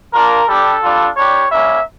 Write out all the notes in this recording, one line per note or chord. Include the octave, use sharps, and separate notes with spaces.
A#3 D4 F4 A#4
G3 D4 G4 A4
G3 D4 F4
G3 D4 G4 C#5
G3 A#3 C#4 E5